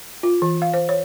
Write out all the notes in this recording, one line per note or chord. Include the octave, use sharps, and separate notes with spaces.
F4
E3
F5
C5
C#5